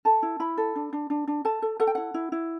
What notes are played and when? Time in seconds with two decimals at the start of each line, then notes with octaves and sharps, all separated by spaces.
0.05 A4 A5
0.23 E4
0.40 E4 B5
0.58 A4
0.76 D4
0.93 D4
1.10 D4
1.27 D4
1.45 A4 A5
1.62 A4
1.80 A4 F#5
1.87 G5
1.95 E4 F#5
2.14 E4
2.32 E4